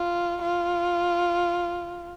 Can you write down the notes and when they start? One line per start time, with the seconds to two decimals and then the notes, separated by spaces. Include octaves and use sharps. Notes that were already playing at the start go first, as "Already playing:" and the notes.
Already playing: F4
0.42 F4